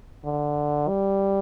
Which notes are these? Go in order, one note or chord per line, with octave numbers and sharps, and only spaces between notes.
D3
G3